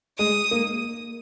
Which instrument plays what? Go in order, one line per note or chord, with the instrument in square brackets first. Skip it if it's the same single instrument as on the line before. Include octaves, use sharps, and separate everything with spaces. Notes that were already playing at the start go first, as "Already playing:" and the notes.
[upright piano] G#3 [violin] D#6
[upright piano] A#3